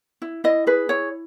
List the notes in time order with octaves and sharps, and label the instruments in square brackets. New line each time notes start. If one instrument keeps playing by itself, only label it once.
[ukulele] E4
E4 D#5
G#4 B4
E4 C#5